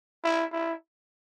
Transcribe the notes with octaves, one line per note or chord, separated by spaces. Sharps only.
E4
E4